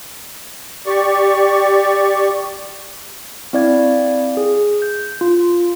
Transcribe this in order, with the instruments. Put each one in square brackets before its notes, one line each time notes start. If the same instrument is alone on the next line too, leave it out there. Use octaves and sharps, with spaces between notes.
[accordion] G4 D5 C#6
[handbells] C4 E4 D5 F5 G#6
G#4
G6
F4